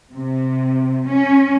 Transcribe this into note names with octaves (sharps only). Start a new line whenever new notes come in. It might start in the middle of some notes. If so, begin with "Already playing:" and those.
C3
C#4